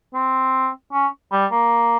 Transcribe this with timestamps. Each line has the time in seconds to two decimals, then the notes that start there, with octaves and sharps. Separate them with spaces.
0.14 C4
0.93 C#4
1.32 G3
1.52 A#3